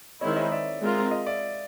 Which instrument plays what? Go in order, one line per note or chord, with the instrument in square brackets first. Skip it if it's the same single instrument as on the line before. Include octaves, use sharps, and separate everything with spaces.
[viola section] D#3 G#3 C4 E4 [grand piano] C#5 D#5
[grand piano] E5
C#5 D#5
D5 E5
[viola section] G#3 C4 F4 A#4
[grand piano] D#5 F5
D5 E5